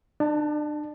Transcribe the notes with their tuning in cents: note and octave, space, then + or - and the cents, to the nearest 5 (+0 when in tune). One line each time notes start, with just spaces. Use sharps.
D4 +35 A5 +0